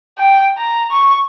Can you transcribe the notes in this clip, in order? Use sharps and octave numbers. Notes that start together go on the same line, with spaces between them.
G5
A#5
C#6